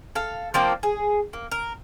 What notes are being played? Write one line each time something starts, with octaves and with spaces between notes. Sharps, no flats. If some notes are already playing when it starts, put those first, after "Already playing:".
A4 F5
F3 A#3 C4 D4
G#4
A#3
A#4